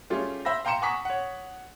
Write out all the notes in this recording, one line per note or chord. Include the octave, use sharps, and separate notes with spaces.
G3 A3 C#4 F4 G#4
C5 E5 B5 E6 A#6
F5 G5 A#5 C6 C#7 E7
F#5 G#5 A#5 C#6 D#6 B6
C#5 F#5